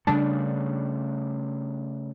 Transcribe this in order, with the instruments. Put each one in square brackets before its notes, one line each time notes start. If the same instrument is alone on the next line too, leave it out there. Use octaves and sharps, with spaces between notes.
[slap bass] C#3 G3 A3 [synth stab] D4